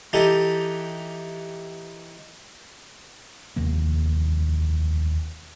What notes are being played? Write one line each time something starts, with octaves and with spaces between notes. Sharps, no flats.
E3 D#4 G4 A4
F1 D#2 A#3